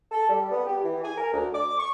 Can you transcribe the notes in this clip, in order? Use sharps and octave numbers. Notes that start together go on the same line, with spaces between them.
A4
G3
B3
G4
E3
G#5
A#4
D2
D6
C#6